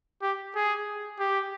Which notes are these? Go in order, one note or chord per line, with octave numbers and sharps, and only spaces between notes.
G4
G#4
G4